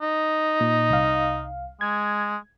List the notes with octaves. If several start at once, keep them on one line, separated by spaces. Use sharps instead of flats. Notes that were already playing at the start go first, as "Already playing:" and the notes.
D#4
A#2
C2 F5
G#3 G#6